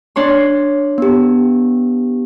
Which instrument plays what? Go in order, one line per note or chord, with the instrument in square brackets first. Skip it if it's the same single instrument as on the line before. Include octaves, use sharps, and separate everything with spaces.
[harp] D4 C#5 C6
[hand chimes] B3 G4